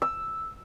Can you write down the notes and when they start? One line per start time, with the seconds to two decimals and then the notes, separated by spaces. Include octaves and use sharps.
0.02 E6